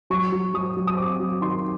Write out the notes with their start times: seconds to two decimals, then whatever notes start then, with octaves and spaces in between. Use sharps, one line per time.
0.10 F#3 C#6
0.32 F#3
0.54 F#3 D#6
0.77 F#3
0.87 D#6
0.97 C4 D6
1.20 F#3
1.41 D#3 C6